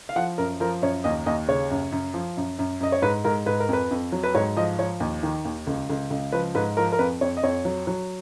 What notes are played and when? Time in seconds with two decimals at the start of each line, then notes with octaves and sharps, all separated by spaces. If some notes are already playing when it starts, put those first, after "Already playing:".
0.09 F5
0.16 F3 F#5
0.38 F#2 A#4
0.60 F3 A#4
0.82 F#2 C#5
1.04 D#2 D#5
1.26 D#2 D#5
1.48 C#3 C#5
1.71 F#2
1.92 F#2
2.14 F3
2.37 F#2
2.59 F#2
2.80 F#2 D#5
2.92 C#5
3.02 G#2 B4
3.24 G#2 A#4
3.46 G#2 B4
3.60 A#4
3.69 F2 B4
3.91 F2
4.12 F#3
4.24 B4
4.35 G#2 C#5
4.56 F3 D#5
4.79 F3 C#5
5.00 D#2
5.23 D#3
5.45 D#2
5.67 C#2
5.90 C#2
6.10 C#2
6.32 F3 B4
6.55 G#2 B4
6.77 F3 A#4
6.92 A#4
6.99 F2 B4
7.21 F2 C#5
7.37 D#5
7.43 F2 C#5
7.65 F#3
7.87 F#3